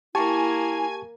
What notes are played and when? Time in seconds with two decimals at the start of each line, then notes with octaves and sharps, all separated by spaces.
0.15 A#3 E4 G4 G#5 A5 C#6